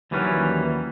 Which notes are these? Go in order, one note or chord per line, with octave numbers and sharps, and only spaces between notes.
D#2 E3 F#3 G3 C#4 B4